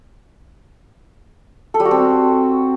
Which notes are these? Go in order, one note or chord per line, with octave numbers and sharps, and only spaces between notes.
A4
G3
F#4
C4